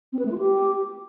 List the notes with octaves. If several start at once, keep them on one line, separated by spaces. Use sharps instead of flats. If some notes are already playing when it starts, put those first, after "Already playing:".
C4
B4
A3
F4
G4